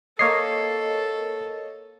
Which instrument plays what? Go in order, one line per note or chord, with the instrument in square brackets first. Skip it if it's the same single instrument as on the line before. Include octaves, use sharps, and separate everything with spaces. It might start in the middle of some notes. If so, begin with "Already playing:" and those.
[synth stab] A#3 C#5 D#5 [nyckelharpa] A4 [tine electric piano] C7